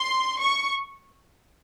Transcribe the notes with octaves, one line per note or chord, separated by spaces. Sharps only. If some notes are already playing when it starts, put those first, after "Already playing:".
Already playing: C6
C#6